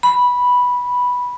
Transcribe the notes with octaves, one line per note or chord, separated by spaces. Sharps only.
B5